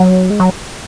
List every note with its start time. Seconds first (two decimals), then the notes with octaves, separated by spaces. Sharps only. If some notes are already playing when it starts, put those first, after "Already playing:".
Already playing: F#3
0.30 G#3
0.40 F#3